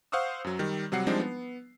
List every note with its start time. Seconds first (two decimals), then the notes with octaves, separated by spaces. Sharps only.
0.12 C5 F5 F#5 C#6 D#6 E6
0.44 F#2 F#3
0.59 D#3 G3
0.92 C3 F#3 G3 F#5 C7
1.07 F3 G3 G#3 C4 D4 D#4
1.20 B3